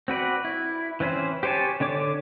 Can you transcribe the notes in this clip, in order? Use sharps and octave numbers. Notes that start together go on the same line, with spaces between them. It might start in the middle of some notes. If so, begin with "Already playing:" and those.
C4 F#4 B4 D5
E4
E3 C4 C#4 B4 C5
G4 C5 C#5 G#5 A5
D3 D4 C#5 D6